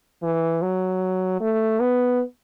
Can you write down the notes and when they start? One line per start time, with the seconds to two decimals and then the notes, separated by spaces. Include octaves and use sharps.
0.23 E3
0.62 F#3
1.41 A3
1.80 B3